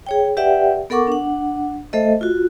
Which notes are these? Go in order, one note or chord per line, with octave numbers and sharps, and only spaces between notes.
G#4 C#5 G5
G4 B4 D5 E5 F#5 G5
B3 A4 A#4 F#5 C#6 D6
D4 F#5
A3 A4 C5 D#5 E5
F4 F#4